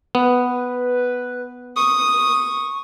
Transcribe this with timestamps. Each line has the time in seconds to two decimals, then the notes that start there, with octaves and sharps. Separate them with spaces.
0.15 B3 B4
1.76 C#6 D#6